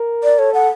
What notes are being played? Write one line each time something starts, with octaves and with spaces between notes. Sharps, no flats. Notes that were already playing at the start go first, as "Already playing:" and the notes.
Already playing: A#4
D5
A4 C#5
F#5